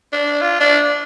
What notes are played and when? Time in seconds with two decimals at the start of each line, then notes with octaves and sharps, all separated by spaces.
0.13 D4
0.41 F4
0.60 D4